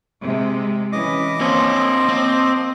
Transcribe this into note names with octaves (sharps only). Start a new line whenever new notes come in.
C3 G#3
E3 C#4 D#5 D6
F3 A#3 C4 C#5
C4